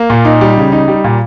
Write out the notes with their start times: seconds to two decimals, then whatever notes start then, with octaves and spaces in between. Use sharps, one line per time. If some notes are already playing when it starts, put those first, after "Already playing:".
Already playing: A#3
0.10 A#2
0.25 D#4
0.41 G3
0.57 C#3
0.72 D#4
0.88 G3
1.04 A#2